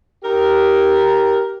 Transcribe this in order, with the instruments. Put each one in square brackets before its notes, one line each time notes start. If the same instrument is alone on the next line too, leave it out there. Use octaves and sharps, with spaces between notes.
[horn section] D#4 G4 A#4